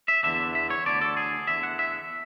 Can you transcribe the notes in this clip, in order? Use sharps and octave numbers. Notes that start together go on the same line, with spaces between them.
E5
E2 D3 E5
E5
C#5
D2 D3 D5
A4
G#4
E2 D3 E5
F#5
E5